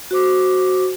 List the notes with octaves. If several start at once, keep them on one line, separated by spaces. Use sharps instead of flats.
F#4 C5 D6